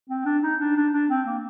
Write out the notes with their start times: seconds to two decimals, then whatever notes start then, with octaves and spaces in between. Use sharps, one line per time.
0.10 C4
0.26 D4
0.43 D#4
0.60 D4
0.76 D4
0.93 D4
1.10 C4
1.27 A#3